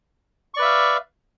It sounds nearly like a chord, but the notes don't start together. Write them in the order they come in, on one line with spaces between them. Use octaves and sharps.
C#6 D5 B4 E5 F5